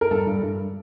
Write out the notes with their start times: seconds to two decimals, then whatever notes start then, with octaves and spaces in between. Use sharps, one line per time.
0.01 A#4
0.11 G2 A4
0.27 G2
0.43 G2